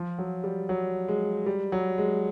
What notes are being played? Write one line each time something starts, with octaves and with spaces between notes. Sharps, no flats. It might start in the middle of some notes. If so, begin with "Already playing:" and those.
Already playing: F3
F#3
G3
F#3
G#3
G3
F#3
G#3